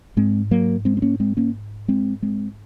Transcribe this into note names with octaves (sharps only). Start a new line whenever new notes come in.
G#2 G#3 C4
F#3 A#3
G#3 C4
C4
A#3 C#4
G#3 C4
A#3 C#4
G#3 C4
G#3 C4